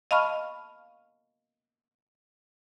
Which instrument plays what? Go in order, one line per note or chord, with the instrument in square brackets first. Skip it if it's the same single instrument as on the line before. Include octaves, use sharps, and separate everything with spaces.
[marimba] D#5 F5 A5 B5 C#6 F6